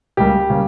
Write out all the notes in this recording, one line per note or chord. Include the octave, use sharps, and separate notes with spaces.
C#2 C#3 G3 A#3 G4
C#3 G3 A#3